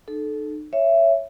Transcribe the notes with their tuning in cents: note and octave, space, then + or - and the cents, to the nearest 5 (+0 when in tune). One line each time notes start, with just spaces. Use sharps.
D#4 -40 A4 -20
C#5 +0 E5 +15